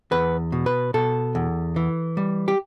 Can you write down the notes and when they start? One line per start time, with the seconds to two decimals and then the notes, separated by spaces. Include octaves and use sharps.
0.12 E2 B4
0.52 B2
0.66 B4
0.94 B2 A4
1.35 E2
1.76 E3
2.17 G3
2.48 G4